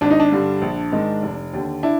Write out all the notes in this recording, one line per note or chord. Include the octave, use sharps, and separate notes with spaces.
G#1 D4
D#4
D4
G2 D3 G3
A#1
G#2 D#3 G#3
F1
D#2 D3
D4 E4